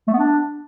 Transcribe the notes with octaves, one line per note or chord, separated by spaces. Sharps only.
A3
B3
D4